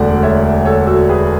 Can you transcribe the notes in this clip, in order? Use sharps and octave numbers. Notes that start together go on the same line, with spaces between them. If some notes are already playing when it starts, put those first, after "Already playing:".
Already playing: E1 D2 D3 D5 F#5
C#5 E5
A4 C#5
F#4 A4
G#4 B4